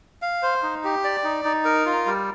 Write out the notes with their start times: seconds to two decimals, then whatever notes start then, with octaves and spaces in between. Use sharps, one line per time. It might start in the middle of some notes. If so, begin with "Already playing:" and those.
0.22 F5
0.43 C5
0.63 D#4
0.84 G4
1.04 D5
1.24 D#4
1.44 D#4
1.65 A#4
1.86 F4
2.06 G3